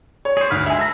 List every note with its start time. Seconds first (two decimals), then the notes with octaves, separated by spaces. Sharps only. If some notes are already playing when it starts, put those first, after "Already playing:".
0.25 C#5
0.37 G#4 C5 C#5
0.50 D2 B4 F6
0.66 G#3 G#4 E5 G#5
0.79 A4 B4 E5 A#5